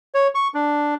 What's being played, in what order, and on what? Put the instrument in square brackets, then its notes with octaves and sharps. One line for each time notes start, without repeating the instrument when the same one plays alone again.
[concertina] C#5
C#6
D4